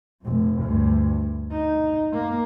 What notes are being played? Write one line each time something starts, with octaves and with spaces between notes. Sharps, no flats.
F1 F2
D2 G2
D#4
A#3